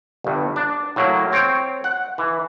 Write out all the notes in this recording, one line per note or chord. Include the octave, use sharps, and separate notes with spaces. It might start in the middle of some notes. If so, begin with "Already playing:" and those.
G1 G2
D4
A2 F#3 A#3
C4 C#5 G5
F#5
E3